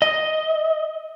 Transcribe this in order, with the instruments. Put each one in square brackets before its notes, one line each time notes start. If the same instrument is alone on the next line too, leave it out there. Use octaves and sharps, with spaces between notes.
[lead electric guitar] D#5